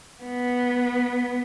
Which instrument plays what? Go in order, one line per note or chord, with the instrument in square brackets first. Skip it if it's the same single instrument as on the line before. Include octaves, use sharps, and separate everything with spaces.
[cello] B3